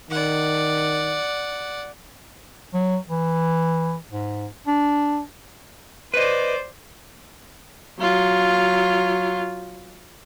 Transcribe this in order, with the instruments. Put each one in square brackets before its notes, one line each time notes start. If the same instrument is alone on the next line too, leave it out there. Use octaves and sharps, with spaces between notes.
[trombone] D#3 [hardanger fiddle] D5 F#5
[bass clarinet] F#3
E3
G#2
D4
[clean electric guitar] B4 D#5 [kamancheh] C5 D5
[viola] F#3 F4